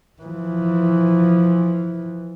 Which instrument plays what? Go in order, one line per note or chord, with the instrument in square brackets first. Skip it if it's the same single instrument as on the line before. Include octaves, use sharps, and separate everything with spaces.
[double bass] E3 F3